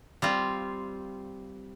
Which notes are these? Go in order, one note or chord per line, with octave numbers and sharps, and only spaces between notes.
G3 C4 F4